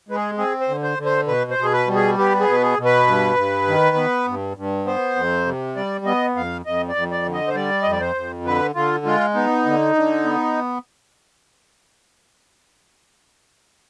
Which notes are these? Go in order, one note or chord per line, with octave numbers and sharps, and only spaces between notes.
G#3 B4
G#4
C4 G#4
C5
D3
C5
D3
C5
B2 B4
C5
B2
G#4
B4
G3
G#4
B3 G4
G#4
B2 B4
G#4
B2
B4
G2
G2
D#3
B3
G2
G2
B3 C5
F2
C3
G3 D5
B3 D#5
F2 F5
F2 D#5
D5
F2
D5
D3
D#5
C5
G3 D5
F2 D#5
D5
C5
F2
D3 B4
D3 F4
G#3 F4
B3 D#4
D3
D3
B3